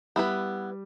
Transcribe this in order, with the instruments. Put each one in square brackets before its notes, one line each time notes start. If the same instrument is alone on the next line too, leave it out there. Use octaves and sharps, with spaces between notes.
[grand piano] G3 [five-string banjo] B3 E4 B4